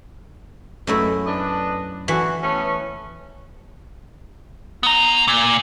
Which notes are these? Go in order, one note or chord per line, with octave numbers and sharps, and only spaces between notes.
F#2 B2 A3 E4
D4 B4 D#5
D3 E3 F#4
A3 B3 C#4
B3 A#5
A#2